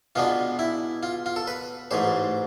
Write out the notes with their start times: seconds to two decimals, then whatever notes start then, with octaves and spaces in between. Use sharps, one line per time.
0.16 B2 G#3 B3 D4 F4
0.59 E4
1.03 F4
1.26 F4
1.36 A4
1.48 B4
1.91 A1 G#2 G#3 C5